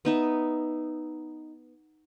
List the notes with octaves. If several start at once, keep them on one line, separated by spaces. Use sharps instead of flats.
B3 D#4 E5